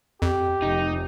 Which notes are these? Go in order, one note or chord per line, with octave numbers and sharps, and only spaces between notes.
F2 G4
F1 D#4